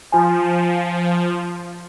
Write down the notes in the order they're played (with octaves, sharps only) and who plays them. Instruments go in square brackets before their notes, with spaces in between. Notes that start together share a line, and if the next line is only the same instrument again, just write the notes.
[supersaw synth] F3 [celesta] F4 G#5